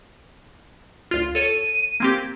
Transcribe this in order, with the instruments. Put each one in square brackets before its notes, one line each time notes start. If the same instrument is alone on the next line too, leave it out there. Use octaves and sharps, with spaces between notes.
[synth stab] D2 F4
[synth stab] A4 C#5 [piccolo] D#7
[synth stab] A#3 C4 G4 [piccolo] G#6